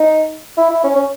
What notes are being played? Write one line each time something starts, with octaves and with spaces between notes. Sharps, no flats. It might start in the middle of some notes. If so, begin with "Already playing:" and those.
Already playing: D#4
E4
E4
C#4
C#4